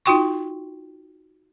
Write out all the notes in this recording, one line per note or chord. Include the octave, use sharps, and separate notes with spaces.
D#4 F4 F#4 G5 C6 C#6